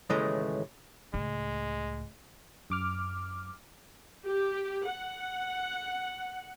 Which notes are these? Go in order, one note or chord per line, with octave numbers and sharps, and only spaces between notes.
D#2 A2 C#3 E3 G#3 A3
C#2 A2 G#3
F#2 D6 F6
G4
F#5